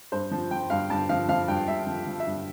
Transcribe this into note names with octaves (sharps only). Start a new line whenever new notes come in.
G2 C5
F3
F3 G5
G2 F5
G2 A5
F3 F5
F3 F5
G2 G5
G2 E5
F3
F3
E5
G2